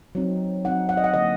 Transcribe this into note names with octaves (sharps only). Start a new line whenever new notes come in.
F#3 C4 D#4
F#3 C4 D#4 F#5
F#5
D#5
F#5
D3 F#3 A#3 D#5